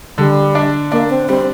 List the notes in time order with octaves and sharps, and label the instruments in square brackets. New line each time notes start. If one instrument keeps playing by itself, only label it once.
[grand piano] D3 [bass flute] G3
[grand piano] D4
[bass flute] A#3 [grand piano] D4
[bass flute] C4
[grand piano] G3 [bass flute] C4